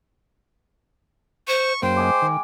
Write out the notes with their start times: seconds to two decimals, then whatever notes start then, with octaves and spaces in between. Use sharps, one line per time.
1.48 C5 C#6
1.82 F#2 A#3 C5 G5
1.96 G#3 G#5 D6
2.22 D#3